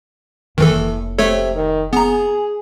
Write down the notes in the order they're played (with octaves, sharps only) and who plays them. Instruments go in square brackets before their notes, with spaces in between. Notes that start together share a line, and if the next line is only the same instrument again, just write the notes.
[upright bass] F1 A#3 [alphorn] A2 [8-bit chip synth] D#3 E3 A4
[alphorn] C3 [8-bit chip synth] A3 A4 C#5
[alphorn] D#3
[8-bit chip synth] B3 A#5 [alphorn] G#4